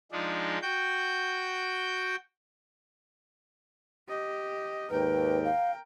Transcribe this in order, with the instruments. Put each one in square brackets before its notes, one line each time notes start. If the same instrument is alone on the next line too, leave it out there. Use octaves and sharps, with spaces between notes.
[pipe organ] F3 G#3 D4 D#4
F#4 G5 G6
[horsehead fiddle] G4 D#5
[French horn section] D#2 G#2 [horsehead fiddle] A#4 G5 [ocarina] B4
[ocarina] F5